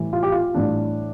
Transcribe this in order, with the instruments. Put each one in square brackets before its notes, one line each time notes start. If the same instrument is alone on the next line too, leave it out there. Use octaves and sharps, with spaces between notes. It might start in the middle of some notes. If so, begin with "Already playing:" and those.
Already playing: [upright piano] A2 E3 G3
F4
G4
F4
A2 E3 G3 D4